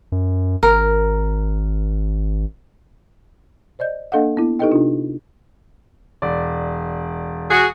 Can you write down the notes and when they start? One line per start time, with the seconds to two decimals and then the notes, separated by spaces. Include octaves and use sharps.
0.12 F#2
0.63 G#1 A#4
3.79 C5 D5 D#5 G6
4.12 A#3 D4 A4 D#5 F5 F#5
4.37 B3 E4
4.59 D#4 G4 A4 B4 D#5 G5
4.71 C3 D4 E4 F4
6.22 E1 D5
7.50 F#4 G#4